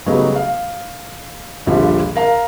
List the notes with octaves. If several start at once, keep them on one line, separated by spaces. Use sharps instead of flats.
C#3 F#3 G3 A3 B3 D#4
F5
A#1 D#2 D3 F3 G3
A#4 F5 A#5